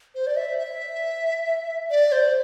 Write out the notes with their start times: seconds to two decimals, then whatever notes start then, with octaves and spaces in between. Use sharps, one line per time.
0.15 C5
0.27 D5
0.36 E5
0.58 E5
1.91 D5
2.12 C5